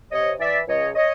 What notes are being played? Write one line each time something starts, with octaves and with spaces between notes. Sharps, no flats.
C3 C#5 D#5
E3 D5 E5
C#2 C#5 D#5
C#5 D#5